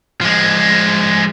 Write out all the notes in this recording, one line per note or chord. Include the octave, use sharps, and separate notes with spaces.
F3 G#3